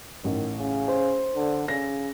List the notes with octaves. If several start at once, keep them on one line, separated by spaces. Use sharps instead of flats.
A1 D#3
C#3
C5
D3
C#3 A#6